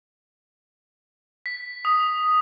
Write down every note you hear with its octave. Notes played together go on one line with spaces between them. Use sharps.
B6
D#6